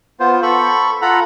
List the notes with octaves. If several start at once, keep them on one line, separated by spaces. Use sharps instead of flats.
B3 F4 C5
A4 B5 C#6
F4 A4 F#5 A#5 B5